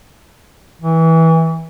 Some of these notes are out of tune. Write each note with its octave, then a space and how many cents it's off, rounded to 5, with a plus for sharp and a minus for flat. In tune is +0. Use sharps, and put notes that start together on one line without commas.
E3 -20